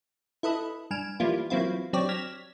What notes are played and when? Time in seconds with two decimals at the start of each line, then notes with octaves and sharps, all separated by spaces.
0.43 E4 A4 B4 D#5
0.91 G2 G#5 F6 D7 E7
1.20 E3 F3 G3 A#3 E4 F4
1.50 E3 F#3 A#3 C4 E4 F4
1.93 F#3 C4 D4 G4 C#5 D5
2.09 F6 G#6 A#6 B6 E7